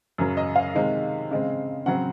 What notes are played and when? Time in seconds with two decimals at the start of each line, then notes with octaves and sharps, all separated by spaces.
0.18 F#2 C#3 F#3
0.37 D#5
0.56 F5
0.75 C3 D#3 G#3
1.31 C#3 G#3 C4
1.86 C#3 F#3 C4 F#5